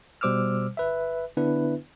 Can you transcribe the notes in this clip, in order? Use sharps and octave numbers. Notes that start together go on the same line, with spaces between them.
B2 G3 C5 D6 E6 F6
G1 B4 E5
D3 B3 D4 E4 B4 E5